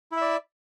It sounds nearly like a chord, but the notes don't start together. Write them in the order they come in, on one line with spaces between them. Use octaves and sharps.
E4 E5 D5